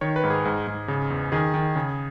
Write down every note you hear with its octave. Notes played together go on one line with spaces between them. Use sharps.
D#3 C#5
B4
G#2
G#4
G#2
G#2
C#3
E2
D#3 G#4
D#3
C#3